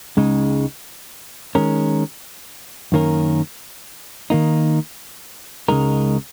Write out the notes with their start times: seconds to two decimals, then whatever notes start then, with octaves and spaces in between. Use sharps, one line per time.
0.17 C#2 C#3 G#3 D#4
1.55 D#3 G#3 C#4 A#4
2.92 F#2 D#3 A#3 C#4 A#4
4.30 D#3 A#3 D#4
5.68 C#2 C#3 G#3 D#4 A#4